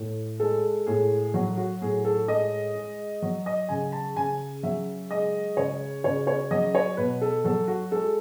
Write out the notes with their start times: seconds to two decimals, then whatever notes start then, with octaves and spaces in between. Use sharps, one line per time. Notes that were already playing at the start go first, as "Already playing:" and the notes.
Already playing: A2
0.40 G#3 A4
0.87 A2 G#4
1.34 F#3 F#4
1.58 F#4
1.81 A2 G#4
2.05 A4
2.28 G#3 D#5
2.75 G#3
3.22 F#3
3.46 D#5
3.68 C#3 G#5
3.92 A5
4.16 C#3 G#5
4.63 F#3 E5
5.11 G#3 D#5
5.57 C#3 C#5
6.04 C#3 C#5
6.27 C#5
6.51 F#3 D#5
6.75 C#5
6.97 B2 B4
7.22 A4
7.45 F#3 A4
7.68 F#4
7.91 G#3 A4